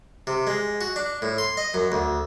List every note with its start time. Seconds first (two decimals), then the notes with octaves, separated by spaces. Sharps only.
0.27 C3
0.47 G#3
0.81 F#4
0.96 D4
1.22 A2
1.38 C6
1.57 D#5
1.74 F#2
1.92 D2